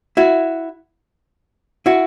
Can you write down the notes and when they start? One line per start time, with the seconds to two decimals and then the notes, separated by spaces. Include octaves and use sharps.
0.17 E4 F#4
1.86 E4 F#4